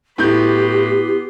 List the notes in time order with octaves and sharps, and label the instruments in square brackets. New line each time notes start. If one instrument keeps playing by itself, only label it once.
[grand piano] A2 G6 [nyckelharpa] B3 C6 [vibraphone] E4 F#4 [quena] G4